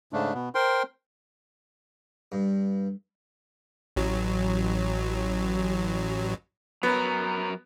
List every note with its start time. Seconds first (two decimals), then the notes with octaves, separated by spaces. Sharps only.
0.13 G#2 C#3 A3 D4
0.34 B2 B3
0.55 A#4 C5 G5 C6
2.32 G2
3.96 A1 F#3
6.83 F#3 B3 A#4